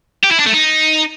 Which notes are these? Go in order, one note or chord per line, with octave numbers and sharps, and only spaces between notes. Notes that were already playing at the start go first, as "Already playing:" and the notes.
G4
E4
D4
A3
D#4